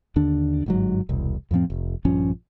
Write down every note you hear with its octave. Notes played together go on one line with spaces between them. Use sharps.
D#2 D3 D4
G1 G#2 F#3
E1 C2
F2 A2 F3 C4
F1
A#1 G2 F3 C#4